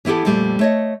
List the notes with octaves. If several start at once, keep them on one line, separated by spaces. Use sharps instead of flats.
E3 B3 E4 G4 A4
F2 A#2 G3 A3
A3 C#5 D#5